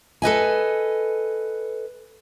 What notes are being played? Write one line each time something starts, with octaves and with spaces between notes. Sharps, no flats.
A4 B4 D#5 G#5